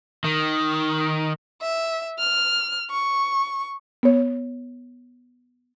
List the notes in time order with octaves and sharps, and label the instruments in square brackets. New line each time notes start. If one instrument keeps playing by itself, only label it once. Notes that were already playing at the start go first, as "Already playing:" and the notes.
[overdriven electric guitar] D#3
[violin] E5
F6
C#6
[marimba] B3 C#5